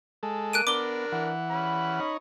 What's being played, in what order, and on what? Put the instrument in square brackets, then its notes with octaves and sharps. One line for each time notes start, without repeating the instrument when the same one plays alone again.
[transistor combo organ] G#3 A4
[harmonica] A#3 [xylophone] F#6 D7 D#7
[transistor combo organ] B3 [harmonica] D4 A#4 [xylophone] D6 G7
[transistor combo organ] E3 F#5
[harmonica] C#4 B5
[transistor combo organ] D#4 C#5